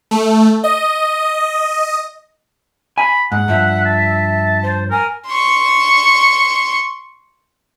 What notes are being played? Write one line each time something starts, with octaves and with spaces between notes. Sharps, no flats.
A3
D#5
G#5 B5
G#2 F#5
G2 F3 E5
A5
C5
A#4 G#5
C6 C#6